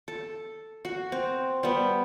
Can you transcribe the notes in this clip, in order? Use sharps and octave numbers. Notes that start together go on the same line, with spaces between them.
A4
F#4
C4
G3 B3